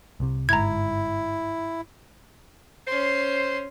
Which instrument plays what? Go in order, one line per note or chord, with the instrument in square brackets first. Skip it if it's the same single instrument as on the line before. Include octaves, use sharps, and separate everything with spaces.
[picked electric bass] C2 C3
[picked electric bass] G1 G#2 [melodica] E4 [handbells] A#5 G#6
[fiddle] C#4 C6 [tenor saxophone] C5